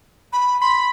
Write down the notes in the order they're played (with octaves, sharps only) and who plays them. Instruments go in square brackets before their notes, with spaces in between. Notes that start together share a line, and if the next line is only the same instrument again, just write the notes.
[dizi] B5
[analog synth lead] B5 [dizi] C6